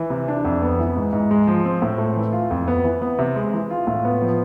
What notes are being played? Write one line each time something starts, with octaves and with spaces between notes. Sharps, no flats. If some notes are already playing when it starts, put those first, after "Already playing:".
Already playing: E3
C3
D4
F2
B3
E3
G#2
G#2
G#3
F3
C4
A2
A3
E3
F4
F2
B3
E3
B3
C3
G#3
E3
F4
A2
B3
F3